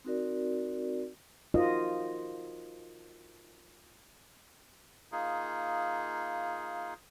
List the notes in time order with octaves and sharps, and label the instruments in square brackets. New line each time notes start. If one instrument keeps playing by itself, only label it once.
[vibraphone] C4 D#4 F#4 A#4 D5
[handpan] D#4 F4 F#4 A#4 C5 D#5
[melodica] A#3 D#4 F4 G#4